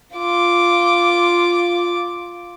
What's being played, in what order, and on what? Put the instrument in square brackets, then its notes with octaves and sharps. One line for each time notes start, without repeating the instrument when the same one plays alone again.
[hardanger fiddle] F4 D6